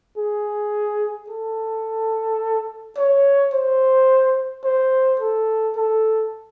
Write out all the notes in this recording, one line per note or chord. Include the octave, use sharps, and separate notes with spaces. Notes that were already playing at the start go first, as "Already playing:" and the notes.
G#4
A4
C#5
C5
C5
A4
A4